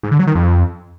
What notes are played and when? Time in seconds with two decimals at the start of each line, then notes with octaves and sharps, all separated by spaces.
0.03 G#2
0.11 D3
0.19 F#3
0.27 D#3
0.35 F2